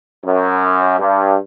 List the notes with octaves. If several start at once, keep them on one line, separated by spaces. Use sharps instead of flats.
F#2
G2